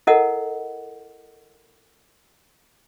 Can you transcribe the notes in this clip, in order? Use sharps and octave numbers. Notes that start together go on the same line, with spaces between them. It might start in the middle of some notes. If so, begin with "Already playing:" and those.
E4 A4 A#4 D#5 F#5